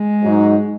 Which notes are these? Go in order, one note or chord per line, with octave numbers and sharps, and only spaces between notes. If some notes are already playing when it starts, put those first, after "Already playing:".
Already playing: G#3
G#2 F#3 D#4